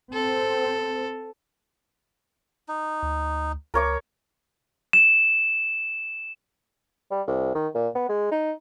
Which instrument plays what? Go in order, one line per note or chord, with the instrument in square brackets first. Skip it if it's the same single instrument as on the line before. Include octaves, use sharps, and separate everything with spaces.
[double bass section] C4 [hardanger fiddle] A4
[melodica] D#4
[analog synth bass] D2
[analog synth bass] C#2 [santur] A#4 C#5 D6
[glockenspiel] E7
[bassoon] G3
C2
D#3
A#2
B3
G#3
D#4